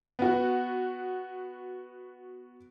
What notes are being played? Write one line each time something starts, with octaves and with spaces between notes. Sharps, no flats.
B3 F#4